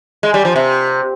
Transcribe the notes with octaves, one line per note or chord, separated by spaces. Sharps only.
G#3
G3
F3
C3